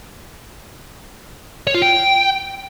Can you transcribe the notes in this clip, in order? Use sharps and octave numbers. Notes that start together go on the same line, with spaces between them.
C#5
F4
G5